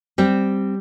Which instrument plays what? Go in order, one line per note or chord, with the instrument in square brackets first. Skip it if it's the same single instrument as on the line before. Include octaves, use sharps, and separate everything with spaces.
[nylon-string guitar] G3 C4